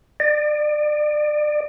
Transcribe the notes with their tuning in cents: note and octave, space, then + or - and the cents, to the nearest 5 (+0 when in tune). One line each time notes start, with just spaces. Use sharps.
D5 +30